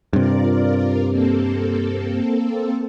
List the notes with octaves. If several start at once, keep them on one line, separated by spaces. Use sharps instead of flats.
G2 C3 F4 A#4 D5
A#3 C4 A4